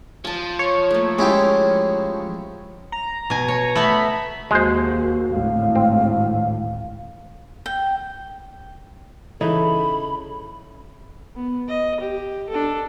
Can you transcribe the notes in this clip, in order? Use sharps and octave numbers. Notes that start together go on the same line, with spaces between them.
F3 G#5 A5
C#5
A3 A#3
G#3 C#4 E4 F4 G4
A#5
B2 G#5
C#5
A3 B3 B5
D#2 G#3 F#4 C5
G#1 D2 A2 F5
C4
G5
C#3 E3 D#4 E4 A4 B5
B3
D#5
G4
D4 A4